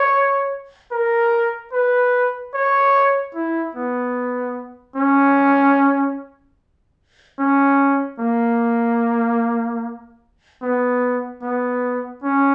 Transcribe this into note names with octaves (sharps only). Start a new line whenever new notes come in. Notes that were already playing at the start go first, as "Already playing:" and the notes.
Already playing: C#5
A#4
B4
C#5
E4
B3
C#4
C#4
A#3
B3
B3
C#4